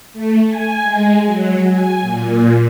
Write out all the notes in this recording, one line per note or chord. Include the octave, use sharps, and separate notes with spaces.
A3
G#5
G#3
F#3
G#5
A#2